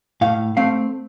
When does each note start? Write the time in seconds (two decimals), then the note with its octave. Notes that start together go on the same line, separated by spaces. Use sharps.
0.21 A2 F5
0.57 A3 C4 F5